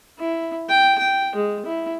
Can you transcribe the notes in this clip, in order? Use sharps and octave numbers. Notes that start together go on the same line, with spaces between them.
E4
G5
G5
G#3
E4